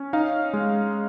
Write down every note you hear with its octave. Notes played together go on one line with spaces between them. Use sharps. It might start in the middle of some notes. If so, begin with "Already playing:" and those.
Already playing: C#4
D#4 F5
G#3